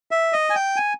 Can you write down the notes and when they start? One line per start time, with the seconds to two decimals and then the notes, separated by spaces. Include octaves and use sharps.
0.11 E5
0.33 D#5
0.50 G#5
0.55 G5
0.76 G#5